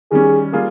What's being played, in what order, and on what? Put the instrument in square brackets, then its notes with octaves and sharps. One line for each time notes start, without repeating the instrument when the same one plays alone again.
[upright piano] D#3 G3 C#4 [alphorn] G#4
[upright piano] G3 A#3 F4 G#4